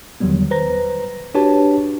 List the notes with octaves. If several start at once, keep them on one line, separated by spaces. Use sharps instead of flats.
E2 D3 D#3 F#3 G3 B3
B4 C5 A#5 A#6
D4 F#4 G4 B4 C#5 A5